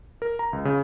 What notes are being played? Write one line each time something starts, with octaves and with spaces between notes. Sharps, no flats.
A#4
A#5
C#2
C#3